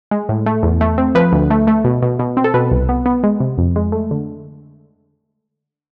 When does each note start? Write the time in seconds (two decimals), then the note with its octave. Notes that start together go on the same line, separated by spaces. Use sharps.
0.11 G#3
0.29 A2
0.46 A3
0.63 E2
0.81 A3
0.98 C4
1.15 F3 B4
1.33 D2
1.50 A3
1.67 A3
1.84 B2
2.02 B2
2.19 B2
2.37 C4
2.44 A4
2.54 B2 B4
2.71 C2
2.89 B3
3.06 B3
3.23 G#3
3.40 C3
3.58 F2
3.76 G#3
3.92 A3
4.11 D3